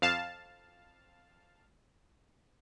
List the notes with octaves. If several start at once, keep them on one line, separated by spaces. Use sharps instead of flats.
F2 F5 A5